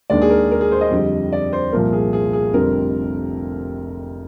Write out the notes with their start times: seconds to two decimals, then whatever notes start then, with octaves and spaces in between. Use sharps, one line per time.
0.10 D#2 D#3 G#3 D4 D5
0.22 G#4
0.30 A#4
0.51 A#4
0.61 G#4
0.72 C5
0.81 D#5
0.91 F2 D3 G3
1.32 D5
1.53 C5
1.72 C2 A#2 F3 A#4
1.93 G#4
2.13 G#4
2.33 G#4
2.53 F1 F2 D3 G3 C4 A#4